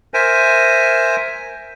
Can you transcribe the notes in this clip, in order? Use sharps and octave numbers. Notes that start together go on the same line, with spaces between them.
A#4 C5 E5 G#5